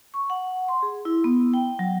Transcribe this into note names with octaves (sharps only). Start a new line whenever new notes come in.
C#6
F#5
C6
G#4
E4
B3
G5
F#3